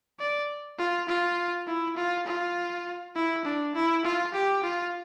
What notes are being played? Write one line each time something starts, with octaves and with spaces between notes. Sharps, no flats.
D5
F4
F4
E4
F4
F4
E4
D4
E4
F4
G4
F4